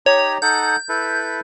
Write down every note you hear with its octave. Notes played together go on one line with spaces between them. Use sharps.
D#4 G4 C#5 A#5
D#4 A4 F#5 G6
E4 A4 B4